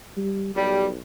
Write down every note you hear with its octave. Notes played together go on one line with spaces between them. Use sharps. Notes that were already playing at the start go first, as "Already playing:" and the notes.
G3
B1 G3